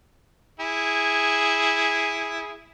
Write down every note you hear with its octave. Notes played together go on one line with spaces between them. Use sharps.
E4 G#4